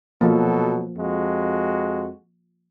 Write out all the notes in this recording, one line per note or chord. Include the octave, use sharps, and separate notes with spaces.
B2 F3 F#3 A#3 A4
F2 G#3 F#4